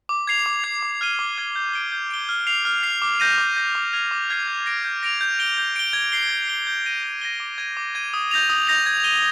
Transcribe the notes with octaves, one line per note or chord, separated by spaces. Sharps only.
D6
G#6 C7 F7
D6
G#6 C7 F7
D6
F6 G#6 D#7 G7
D6
F6 G#6 D#7 G7
G6
D7 G7
G6
D7 G7
F6
C7 F7
F6
C7 F7
D6
G6 A#6 D#7
D6
G6 A#6 D#7
D6
F6 G#6 C7 F7
D6
F6 G#6 C7 F7
G6
A#6 D7 F7
G6
A#6 D7 F7
G6
D7 G7
G6
D7 G7
G#6
C7 G7
G#6
C7 G7
G6
A#6 D#7 G7
G6
A#6 D#7 G7
D6
G#6 D#7
D6
G#6 D#7
D#6
G6 A#6 F7
D#6
G6 A#6 F7
G#6
D#7 G7